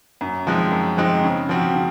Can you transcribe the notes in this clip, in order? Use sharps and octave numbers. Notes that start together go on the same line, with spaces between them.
F#2
F3 G#3 C4 D#4
F#2
F3 G#3 C4 D#4
C#3
F3 C4 F#4
C#3